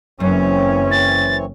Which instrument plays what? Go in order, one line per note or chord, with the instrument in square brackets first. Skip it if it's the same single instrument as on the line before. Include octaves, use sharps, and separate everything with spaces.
[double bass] F#1 C#4 [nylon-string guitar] F#2 [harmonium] E3 C4 C#5
[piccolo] A6